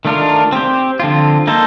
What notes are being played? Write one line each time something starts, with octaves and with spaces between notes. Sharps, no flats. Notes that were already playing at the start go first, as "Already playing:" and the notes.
D#3 A3 D4 F4 A#4
C4 G4 C5
D3 F3 C4 F4
A#3 D#4 A4 C5